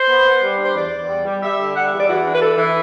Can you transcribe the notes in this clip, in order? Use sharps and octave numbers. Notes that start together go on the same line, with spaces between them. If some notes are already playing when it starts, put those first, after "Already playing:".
Already playing: C5
B3
B3
G3
D4
C5
E2 D5
E2
G3
G3
G3 E5
D3
G3 F#5
E5
E2
D5
E3 F#4
D4
B4
E3 A4
E3